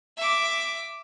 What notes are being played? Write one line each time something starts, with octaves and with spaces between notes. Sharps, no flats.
E5 D6